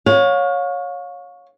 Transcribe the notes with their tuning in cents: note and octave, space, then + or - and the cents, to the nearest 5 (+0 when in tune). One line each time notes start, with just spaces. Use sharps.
C#5 +0 F5 +35